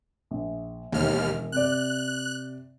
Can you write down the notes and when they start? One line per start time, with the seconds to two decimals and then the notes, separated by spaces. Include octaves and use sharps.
0.31 A#1
0.92 E1 D#2 F6
1.52 C3 D5 F#6